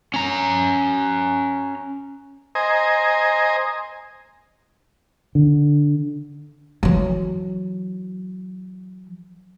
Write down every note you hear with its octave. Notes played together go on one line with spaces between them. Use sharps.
C#4 A#5
C5 D#5 G#5 A#5
D3
E3 F#3